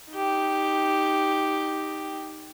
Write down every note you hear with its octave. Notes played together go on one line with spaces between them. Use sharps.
D#4 G4